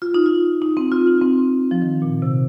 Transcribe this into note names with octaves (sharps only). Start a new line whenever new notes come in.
F4
D#4
F4
D#4
C4
F4
D#4
C4
F3
D#3
A#2
C3